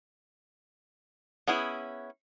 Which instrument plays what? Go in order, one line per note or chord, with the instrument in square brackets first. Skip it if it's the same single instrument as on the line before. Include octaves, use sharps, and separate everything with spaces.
[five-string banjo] B3 C#4 E4 G#4